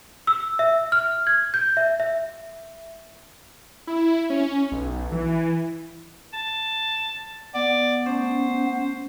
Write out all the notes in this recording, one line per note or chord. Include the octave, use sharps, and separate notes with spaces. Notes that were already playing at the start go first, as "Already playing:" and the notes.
E6
E5
F6
G#6
G6
E5
E5
E4
C#4
B1
E3
A5
B3 D5
A3 C#4 C5